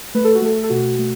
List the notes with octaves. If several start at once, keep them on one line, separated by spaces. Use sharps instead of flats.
A3 B4
A4
F#4
A3 A4
A4
B2 F#4
A3